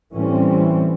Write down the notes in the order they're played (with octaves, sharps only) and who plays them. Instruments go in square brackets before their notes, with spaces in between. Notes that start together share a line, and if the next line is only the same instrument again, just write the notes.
[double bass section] A2 E3 G3 C4 C#4